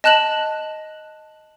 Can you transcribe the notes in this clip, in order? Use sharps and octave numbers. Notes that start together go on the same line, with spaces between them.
D#5 A5 F#6 E7 F#7